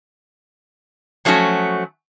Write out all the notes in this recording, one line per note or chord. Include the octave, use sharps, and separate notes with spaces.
F3 F#3 A3 C#4 F#4